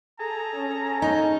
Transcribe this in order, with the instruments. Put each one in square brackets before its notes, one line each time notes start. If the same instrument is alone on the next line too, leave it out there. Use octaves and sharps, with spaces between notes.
[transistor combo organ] G#4 A4 [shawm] A#5
[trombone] C#4
[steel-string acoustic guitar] D#4